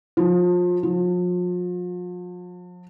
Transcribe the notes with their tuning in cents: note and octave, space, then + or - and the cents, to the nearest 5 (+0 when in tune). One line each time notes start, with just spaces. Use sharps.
F3 +30
F3 +40